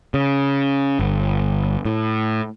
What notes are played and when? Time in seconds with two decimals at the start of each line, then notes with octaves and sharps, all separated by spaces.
0.14 C#3
0.99 G1
1.85 A2